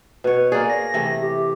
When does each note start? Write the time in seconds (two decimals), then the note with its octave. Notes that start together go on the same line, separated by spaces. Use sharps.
0.24 B2 B4 C#5
0.52 A#3 G#4 D5
0.70 A#6
0.94 C3 E3 A3
1.23 G4